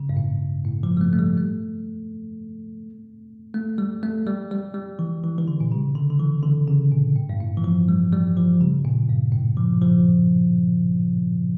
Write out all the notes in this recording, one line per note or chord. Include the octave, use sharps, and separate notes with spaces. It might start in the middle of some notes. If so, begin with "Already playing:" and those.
Already playing: C#3
G2
A2
A2
F3
G3
A3
A3
G3
A3
A3
G3
A3
G3
G3
G3
E3
E3
E3
D3
A#2
C#3
D3
D3
E3
D3
C#3
A#2
A2
G2
A2
E3
F3
G3
G3
F3
C#3
A#2
G2
A2
F3
F3